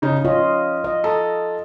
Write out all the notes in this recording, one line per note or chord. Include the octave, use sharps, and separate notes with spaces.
C#3 D#4
C#4 F4 D#5
D#5
A4 A#5